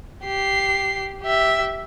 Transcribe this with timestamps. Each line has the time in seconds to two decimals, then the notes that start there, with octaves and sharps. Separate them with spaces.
0.24 G4 C7
1.21 G4 E5